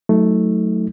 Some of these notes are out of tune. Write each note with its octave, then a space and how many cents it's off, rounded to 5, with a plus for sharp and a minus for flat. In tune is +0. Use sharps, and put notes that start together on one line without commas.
F#3 +5 A3 +0 D#4 +40